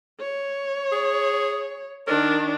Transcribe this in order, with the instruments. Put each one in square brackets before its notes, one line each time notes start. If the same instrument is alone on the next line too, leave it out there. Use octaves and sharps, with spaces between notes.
[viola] C#5
[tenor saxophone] G#4
[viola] D#3 D4 [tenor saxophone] A#4